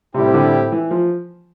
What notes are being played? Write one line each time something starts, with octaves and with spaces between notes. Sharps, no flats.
A2 C3 G3 C4 E4 G4
D3
E3
F3